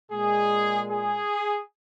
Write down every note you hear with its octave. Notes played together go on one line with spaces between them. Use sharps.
A#2 G#3 G#4
G#4